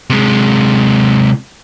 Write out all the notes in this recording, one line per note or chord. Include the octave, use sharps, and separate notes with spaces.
C3 G#3